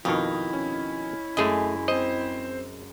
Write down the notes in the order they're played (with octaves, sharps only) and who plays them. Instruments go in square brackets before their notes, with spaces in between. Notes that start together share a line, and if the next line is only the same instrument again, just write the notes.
[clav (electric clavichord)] F2 B2 D#3 [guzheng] D#4 [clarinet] E4
[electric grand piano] C#4
[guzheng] F#2 G#3 [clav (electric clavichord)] A3 G#4 D#5
[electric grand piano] C4 C5 [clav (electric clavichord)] D#5